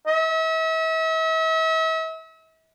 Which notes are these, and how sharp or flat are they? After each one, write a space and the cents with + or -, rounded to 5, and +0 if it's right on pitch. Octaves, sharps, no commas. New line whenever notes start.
E5 -40